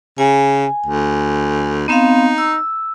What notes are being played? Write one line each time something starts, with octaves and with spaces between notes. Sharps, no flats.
C#3 G#5
D2
B3 C4 D#4 F5
E6